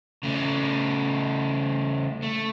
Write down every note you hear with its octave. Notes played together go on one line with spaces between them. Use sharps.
C#3 A3
A3